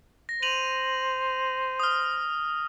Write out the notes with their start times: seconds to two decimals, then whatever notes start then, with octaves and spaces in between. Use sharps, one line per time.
0.29 A#6
0.42 C5 D#7 F7 F#7
1.80 D#6 F6